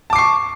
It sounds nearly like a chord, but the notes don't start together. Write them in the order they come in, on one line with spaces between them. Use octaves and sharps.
A5 D6 C7 C#6